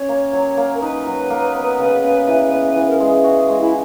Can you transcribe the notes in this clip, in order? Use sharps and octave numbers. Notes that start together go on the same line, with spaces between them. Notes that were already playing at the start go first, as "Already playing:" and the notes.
Already playing: C#4 C#5
A#3
F#3
A#3
A#4
D#4 B4
F#3
A#3
B3
C#3
C#3
E3
B3
E3
A#4
G#3 G#4
F#4
G#3
E4